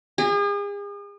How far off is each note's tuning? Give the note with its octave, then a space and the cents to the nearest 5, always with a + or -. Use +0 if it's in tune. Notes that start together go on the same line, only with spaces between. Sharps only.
G#4 -40